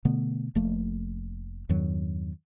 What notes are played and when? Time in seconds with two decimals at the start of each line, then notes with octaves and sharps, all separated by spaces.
0.05 B2 D3 A3 B3
0.55 F1 F3 A3 A#3
1.69 E2 G2 D#3 F#3